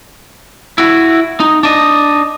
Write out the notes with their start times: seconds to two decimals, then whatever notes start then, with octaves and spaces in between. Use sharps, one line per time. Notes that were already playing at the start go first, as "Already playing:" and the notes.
0.78 E4 F#4
1.40 D#4
1.63 D4 D#5